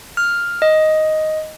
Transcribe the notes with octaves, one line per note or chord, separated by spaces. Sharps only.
F6
D#5